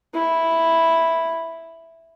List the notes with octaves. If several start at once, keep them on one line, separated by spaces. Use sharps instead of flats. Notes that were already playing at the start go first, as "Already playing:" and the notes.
E4